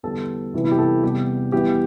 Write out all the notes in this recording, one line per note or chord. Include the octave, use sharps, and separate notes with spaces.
E2 D3 G3 A4
E2 C3 E3 G3
E4
G4
A4
E2 C3 G3 G4
E2 E3 G3 G4